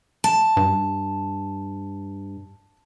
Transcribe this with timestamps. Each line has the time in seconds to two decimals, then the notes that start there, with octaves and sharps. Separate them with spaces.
0.24 A5
0.57 G2